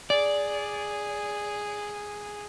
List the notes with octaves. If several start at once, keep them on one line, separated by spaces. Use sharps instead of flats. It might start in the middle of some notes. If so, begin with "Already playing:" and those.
G#4 D5